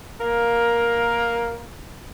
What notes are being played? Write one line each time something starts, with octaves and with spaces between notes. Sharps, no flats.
A#3 A#4 F5